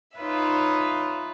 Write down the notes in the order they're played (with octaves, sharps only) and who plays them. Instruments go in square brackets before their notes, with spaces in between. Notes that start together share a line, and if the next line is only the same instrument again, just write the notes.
[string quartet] D#4 F4 B4 C#5 E5